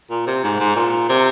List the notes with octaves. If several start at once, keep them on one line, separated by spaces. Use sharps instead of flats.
A#2
C3
G#2
G#2
A#2
C3